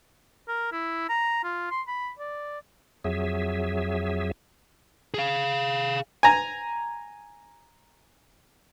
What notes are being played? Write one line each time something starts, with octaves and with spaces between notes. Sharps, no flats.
A#4
E4
A#5
F4
C6
B5
D5
F2 F#3 G#4 E5
G#4 F5
G#5 A#5